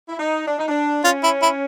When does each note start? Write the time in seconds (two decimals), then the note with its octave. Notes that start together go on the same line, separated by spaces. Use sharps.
0.09 E4
0.19 D#4
0.47 D4
0.58 D#4
0.68 D4
1.04 C#4 F4
1.23 E4
1.42 E4